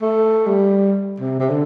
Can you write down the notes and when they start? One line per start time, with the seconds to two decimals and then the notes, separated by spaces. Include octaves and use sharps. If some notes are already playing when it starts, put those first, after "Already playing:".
0.02 A3
0.46 G3
1.20 C3
1.40 C3
1.49 D3